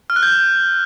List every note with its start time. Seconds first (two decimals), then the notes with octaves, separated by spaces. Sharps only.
0.10 F6
0.16 F#6
0.23 G6